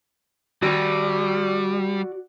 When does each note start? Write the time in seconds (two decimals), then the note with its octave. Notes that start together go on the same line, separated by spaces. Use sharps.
0.62 G3 F#4 D5